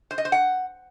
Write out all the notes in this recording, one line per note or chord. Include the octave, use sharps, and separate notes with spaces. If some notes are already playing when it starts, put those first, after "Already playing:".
C5
D#5
C5
F#5